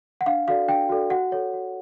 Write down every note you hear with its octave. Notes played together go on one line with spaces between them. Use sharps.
F#5
D4 F5
F#4 A4 D5 F5
D4 G5
F#4 A4 D5
F#4 F#5
A4 C#5
F#4